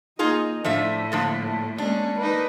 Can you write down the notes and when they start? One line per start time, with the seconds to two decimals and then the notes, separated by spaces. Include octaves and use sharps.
0.19 A#3 D#4 F4 G#4 D#5
0.64 A2 F3 A3 D4 E5
1.12 D3 F3 A#3 D4
1.78 G#3 A#3 C#4 D4
2.19 A#3 D#4 B4